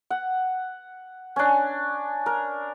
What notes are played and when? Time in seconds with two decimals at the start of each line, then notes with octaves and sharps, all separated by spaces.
0.10 F#5
1.36 C#4 D4
2.26 A#4